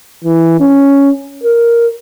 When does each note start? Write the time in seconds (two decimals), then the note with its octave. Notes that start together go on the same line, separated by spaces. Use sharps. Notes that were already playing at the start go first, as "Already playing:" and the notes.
0.24 E3
0.60 C#4
1.43 A#4